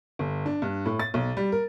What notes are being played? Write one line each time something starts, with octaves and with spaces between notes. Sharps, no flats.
G1
D4
G2
A2
A6
B1
G3
A#4